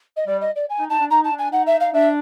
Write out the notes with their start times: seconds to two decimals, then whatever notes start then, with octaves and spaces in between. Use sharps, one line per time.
0.16 D#5
0.27 G3 D5
0.41 D#5
0.55 D5
0.69 G#5
0.79 D#4
0.89 D#4 A5
0.99 D4
1.10 D#4 A#5
1.24 A5
1.31 D4
1.38 G#5
1.52 D#4 F#5
1.66 E5
1.80 F5
1.93 D4 E5